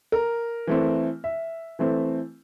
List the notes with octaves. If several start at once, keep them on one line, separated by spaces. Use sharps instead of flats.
A#4
E3 A3 C4
E5
E3 A3 C4